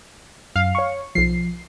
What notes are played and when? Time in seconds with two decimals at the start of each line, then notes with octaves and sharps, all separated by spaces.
0.56 F#2 F5
0.75 C#5 C#6
1.15 B1 F3 C7